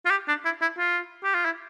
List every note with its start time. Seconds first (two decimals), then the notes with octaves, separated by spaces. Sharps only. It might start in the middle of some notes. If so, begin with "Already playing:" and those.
0.05 F4
0.11 G4
0.28 D4
0.45 E4
0.62 E4
0.78 F4
1.24 G4
1.35 F4
1.45 E4